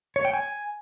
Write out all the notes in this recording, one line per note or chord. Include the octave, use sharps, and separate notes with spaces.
C#5
G5
G#5